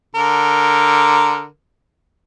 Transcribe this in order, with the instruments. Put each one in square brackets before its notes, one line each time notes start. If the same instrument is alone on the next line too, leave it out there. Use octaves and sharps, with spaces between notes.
[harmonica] D3 A#4